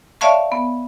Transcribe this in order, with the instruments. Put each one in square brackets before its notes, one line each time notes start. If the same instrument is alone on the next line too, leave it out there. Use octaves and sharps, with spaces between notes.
[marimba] C#5 D5 E5 F5 A5 C#6
B3